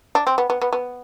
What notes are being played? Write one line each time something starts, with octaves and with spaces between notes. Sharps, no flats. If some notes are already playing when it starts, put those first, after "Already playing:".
D4
C4
B3
B3
B3
B3